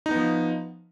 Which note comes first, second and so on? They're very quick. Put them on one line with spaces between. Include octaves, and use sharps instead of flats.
D#4 B3 F3